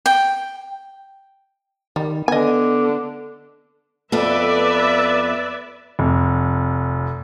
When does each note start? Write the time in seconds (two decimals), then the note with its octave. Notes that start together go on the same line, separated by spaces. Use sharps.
0.06 G5
1.96 D#3 G3
2.28 D3 B3 D#5 G#5
4.12 F2 B3 A4 B4 D5 E5
5.99 F1